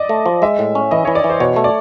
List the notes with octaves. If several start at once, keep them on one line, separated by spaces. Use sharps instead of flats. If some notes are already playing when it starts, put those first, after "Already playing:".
Already playing: D5 D#5
A3
F3
G#3 E5
A2
C#4
E3 D#5
E3 C#5
D5
E3
C5
B2 C#5
A3
D5